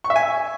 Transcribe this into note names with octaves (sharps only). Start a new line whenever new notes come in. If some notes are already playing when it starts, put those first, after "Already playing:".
C#6
E5
G#5